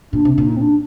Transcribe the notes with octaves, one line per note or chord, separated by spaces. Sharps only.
A#2 D4
C3
D4
A#2
D#4
C4
D4